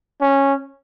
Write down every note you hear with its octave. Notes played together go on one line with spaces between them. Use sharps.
C#4